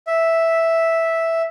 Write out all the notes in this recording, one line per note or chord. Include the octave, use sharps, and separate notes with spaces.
E5